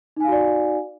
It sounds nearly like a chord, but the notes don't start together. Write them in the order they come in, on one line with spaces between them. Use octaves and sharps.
D#4 G#5 F5 F#4 D5